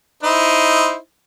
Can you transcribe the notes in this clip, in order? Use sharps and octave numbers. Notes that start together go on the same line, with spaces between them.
D#4 E4 C5